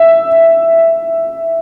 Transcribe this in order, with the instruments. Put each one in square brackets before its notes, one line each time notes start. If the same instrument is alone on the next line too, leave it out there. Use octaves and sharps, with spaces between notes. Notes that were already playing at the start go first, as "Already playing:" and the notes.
Already playing: [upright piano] E5